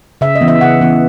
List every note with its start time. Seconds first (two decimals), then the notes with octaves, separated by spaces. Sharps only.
0.21 C#3 E5
0.35 D#5
0.41 E3 B3
0.48 E5
0.61 C#3 F#5
0.81 E3 B3